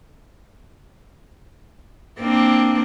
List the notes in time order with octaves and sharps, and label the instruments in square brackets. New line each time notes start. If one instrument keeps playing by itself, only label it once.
[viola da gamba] A#3 C4 D4